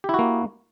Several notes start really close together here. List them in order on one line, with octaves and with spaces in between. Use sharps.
G4 E4 F#4 A#3